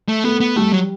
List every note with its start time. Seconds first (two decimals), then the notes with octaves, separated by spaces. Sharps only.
0.08 A3
0.24 A3 B3
0.40 B3
0.56 G3 A3
0.72 F#3